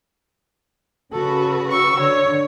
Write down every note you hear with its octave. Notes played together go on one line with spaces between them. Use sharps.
C#3 F#4 A4 B4
C#6 E6
D3 C#5